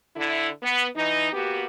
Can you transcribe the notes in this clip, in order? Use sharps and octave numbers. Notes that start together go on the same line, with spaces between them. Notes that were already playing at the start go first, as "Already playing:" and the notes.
D3 E4
B3
E3 D#4
A#3 B3 F#4 G4